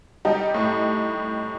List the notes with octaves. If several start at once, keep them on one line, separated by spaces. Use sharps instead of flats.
G3 D#4 G4
A2